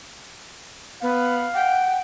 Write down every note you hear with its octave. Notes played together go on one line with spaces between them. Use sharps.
B3 F5
F#5 G5